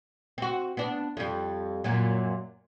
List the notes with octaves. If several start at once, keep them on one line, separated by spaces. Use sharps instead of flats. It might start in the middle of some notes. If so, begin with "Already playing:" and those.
C4 F#4
B3 D4
F2 G3
F#2 A#2 F#3